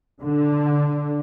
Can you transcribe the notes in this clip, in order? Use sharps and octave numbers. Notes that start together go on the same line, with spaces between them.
D3